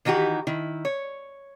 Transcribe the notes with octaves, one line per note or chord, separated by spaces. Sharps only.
D#3 E3 D#4 F#4 G4
D#3 E4
C#5